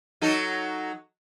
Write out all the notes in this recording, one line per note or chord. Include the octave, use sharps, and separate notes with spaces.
F#3 D#4 A4